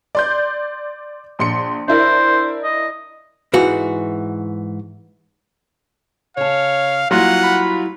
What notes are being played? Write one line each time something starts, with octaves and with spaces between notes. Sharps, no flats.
D5 C6 G6
A#1 C6 C#7
D4 E4 A#4 C5
D#5
G#2 E3 F#4
C#3 C#5 F5 A5
F#3 G3 A#3 E4 F4 F#5
B5